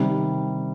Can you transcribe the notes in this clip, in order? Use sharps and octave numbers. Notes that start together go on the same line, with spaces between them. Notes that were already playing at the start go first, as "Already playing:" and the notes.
Already playing: C3 D#3 G3